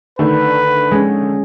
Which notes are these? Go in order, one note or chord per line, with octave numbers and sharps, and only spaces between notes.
D3 D#3 A3 B4
G#3 C#4